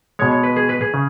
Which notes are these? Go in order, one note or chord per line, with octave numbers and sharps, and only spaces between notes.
B2 G#3 C#5
C#5
B4
G#4
B4
G#4
C#3